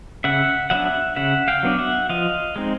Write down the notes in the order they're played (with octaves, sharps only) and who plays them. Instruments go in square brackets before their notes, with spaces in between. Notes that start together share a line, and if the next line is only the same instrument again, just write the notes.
[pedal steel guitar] C#3 E5 F#5
F#3 B3 D4 E5 F#5
C#3 E5 F#5
F5 G5
F#3 B3 D4
E5 F#5
F3 D#5 F5
G#3 C4 D#4